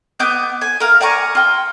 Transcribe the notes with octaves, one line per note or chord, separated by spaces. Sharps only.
B3 D#5 D6 G6
G#5
A#4 F5
D5 G#5 A#5 C#6
F4 G5